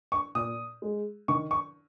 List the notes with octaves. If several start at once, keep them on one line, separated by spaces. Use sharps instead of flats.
C#6
A#2 D#6
G#3
D#3 C#6
C#6